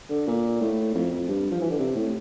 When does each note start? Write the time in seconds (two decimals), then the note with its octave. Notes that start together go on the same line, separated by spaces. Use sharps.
0.10 D3
0.27 A#2
0.61 A2
0.95 F2
1.12 F2
1.29 G2
1.51 F3
1.61 E3
1.70 D3
1.79 C3
1.96 A2